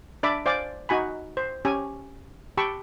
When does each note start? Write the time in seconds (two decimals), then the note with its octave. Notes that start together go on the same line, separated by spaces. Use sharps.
0.23 D4 D5 E5 B5 D6
0.46 C5 D5 F5 G#5 D6
0.89 D#4 F#4 G#5 B5
1.37 C5
1.65 C#4 G4 G#5
2.58 G4 G5 A5 B5 C#6 E6